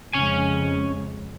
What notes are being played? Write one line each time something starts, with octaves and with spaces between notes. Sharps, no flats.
F2 C#3 G#3 C#4 C#5 G#5